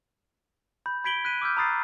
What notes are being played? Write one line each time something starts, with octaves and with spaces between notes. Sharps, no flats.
B5 G6
B5 G#6 B6 D7 F#7 G7
F#6 B6 D#7
D6 E6 F6 G6
A#5 B5 D#6 A6 C7